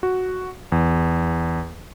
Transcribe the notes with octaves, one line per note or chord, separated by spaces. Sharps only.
F#4
E2